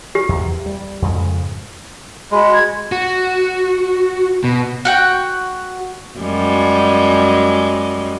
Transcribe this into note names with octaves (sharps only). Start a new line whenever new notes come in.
G4
E2
G3
F2 G#2 C#3
G#3 F#4 B5
G#6
F#4
B2
F#4 F#5 G5
F#2 G3 G#3